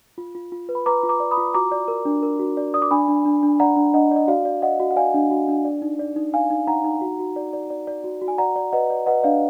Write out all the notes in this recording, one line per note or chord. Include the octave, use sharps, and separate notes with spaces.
F4
F4
F4
B4
B5
B4 A#5 D6
F4
A#5 D6
D5
B5 D#6
F4
F#4 A#5 D6
D5
A#4
D4
A#4
F#4
D5
D5 D#6
D6
D4 G#5 B5
D4
D4
D4
D5 F#5 A#5
D4
D4 D#5 F#5
D5 D#5
F#4 D5 F5
D5
D5 D#5 F#5
F#4
F#5
D5 F5 G#5
D4
F#4
D4
D5
D#4
D5
D#4
D#4 F5 G#5
D#4
D#4 F#5 A#5
D#4
F#4
F#4
D5
D5
D5
D5
F#4
F#4
G#5
D5 F#5 A#5
D5
B4 D#5 F#5
D5
B4 D#5 F#5
D4 D5 F5